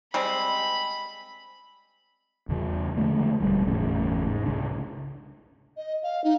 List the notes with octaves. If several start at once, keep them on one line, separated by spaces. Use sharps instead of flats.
G3 G#3 C4 B5
E2 C#3
D3 F3 G#3 A3
E1 D2 G3
G1 E2 A2 C#3
G#2
C2 C#3 D4
D#5
F5
D#4